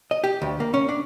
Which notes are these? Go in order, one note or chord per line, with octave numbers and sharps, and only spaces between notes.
D#5
G4
D2
A#3
C#4
D4